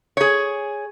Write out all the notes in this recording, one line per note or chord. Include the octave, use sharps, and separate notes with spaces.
G#4 C#5